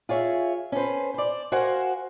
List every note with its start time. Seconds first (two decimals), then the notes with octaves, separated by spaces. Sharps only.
0.09 F4 G#4 C#5 E5
0.72 C#4 A4 B4 C5
1.14 C5 D5
1.52 F#4 A#4 C5 F5 F#5 G#5